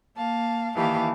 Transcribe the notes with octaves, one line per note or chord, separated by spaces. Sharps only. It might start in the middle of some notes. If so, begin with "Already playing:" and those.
A#3 F5 A5
D#3 E3 A#3 G4 F5 A5